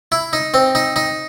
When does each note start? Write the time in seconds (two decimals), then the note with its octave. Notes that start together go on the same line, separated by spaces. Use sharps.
0.12 E4
0.33 D#4
0.54 C4
0.75 D#4
0.96 D#4